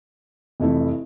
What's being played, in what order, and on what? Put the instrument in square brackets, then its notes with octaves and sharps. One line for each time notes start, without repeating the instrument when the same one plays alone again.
[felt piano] F1 F2 E3 A3 E4